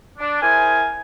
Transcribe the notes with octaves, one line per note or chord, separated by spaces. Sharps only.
D4
E4 G#4 A#4 C5 G#5